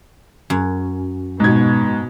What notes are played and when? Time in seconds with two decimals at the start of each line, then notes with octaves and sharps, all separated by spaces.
0.50 F#2
1.40 G#2 B2 G#6